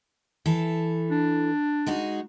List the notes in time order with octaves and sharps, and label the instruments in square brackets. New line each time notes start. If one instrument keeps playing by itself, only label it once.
[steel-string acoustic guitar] E3 A4
[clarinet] D4
[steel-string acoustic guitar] G#3 D#4 F#4